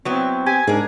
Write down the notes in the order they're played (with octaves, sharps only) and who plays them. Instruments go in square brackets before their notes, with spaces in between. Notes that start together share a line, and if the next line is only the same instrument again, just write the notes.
[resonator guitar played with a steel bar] F#3 B3 E4 [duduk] C4
[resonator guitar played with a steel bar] G4 [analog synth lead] G#5
[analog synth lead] G#2 [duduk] D4 [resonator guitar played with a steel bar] G#4 A#4